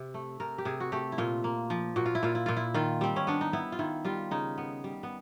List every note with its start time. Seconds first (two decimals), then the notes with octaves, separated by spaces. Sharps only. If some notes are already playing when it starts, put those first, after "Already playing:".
Already playing: C3
0.14 A3
0.40 C3 A#4
0.58 G4
0.65 C3 G#4
0.80 F#4
0.92 A3 G4
1.12 E4
1.18 A#2 F4
1.44 A#3
1.70 F3
1.96 A#2 F#4
2.06 F4
2.15 E4
2.23 A#2 F4
2.35 E4
2.46 A#2 F4
2.57 E4
2.74 D#3 F4
3.01 G3 C4
3.16 C#4
3.27 B3 D4
3.41 D#4
3.53 B3 E4
3.72 F4
3.79 D#3 E4
4.05 G3 F4
4.31 C#3 D#4
4.58 B3
4.84 G3
5.03 B3